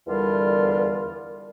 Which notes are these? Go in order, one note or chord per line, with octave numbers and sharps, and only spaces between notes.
E2 D3 G3 F4 A#4